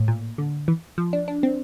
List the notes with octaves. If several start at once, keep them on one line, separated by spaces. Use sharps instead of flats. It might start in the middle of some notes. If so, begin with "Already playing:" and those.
Already playing: A2
A#2
D3
E3
F3
D4
D4
C4